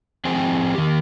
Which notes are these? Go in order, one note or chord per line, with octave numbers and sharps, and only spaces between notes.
F3 C4 G#4 C5 G5 G#5
D#3 G4